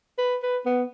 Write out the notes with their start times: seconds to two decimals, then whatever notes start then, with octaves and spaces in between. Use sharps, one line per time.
0.18 B4
0.43 B4
0.65 B3